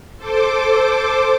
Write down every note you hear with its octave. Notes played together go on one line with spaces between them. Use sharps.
A4 C5 D6